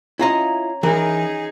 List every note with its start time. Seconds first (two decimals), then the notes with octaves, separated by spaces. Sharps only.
0.19 C#4 E4 F4 D#5 A#5
0.83 E3 D#4 G#4 A#4